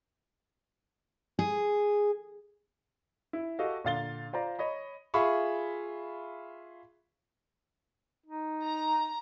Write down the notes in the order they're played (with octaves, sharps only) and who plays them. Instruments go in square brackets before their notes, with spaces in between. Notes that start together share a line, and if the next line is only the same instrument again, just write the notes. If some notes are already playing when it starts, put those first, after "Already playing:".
[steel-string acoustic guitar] G#4
[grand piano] E4
F#4 G4 A4 D#5 F5
A#2 D3 F5 A6 G7
F4 C5 D5 A#5
C#5 D#5 B5
F4 G#4 E5 B5 C#6
[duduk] D#4
[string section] A#5